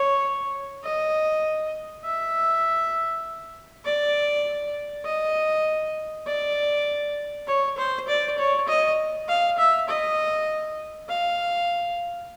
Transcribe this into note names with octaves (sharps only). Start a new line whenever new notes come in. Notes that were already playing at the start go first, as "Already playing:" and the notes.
Already playing: C#5
D#5
E5
D5
D#5
D5
C#5
C5
D5
C#5
D#5
F5
E5
D#5
F5